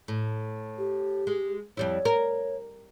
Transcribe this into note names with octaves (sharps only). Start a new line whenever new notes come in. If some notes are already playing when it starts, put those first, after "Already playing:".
A2
G4
G#3
F2 G3 E4 C#5
A#4